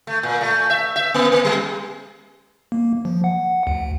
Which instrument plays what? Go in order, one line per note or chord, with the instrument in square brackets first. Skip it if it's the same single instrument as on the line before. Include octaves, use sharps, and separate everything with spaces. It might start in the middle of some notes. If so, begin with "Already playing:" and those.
[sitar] A3
A#2
A3
E5
E5
A#3
A#3
G3
[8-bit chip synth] A#3
F3
F#5
D2